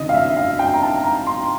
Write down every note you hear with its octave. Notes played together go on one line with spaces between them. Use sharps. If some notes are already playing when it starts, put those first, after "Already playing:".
Already playing: C#2 C3 D#3 D#5
F5
E5
F5
G5
A#5
A5
A#5
C6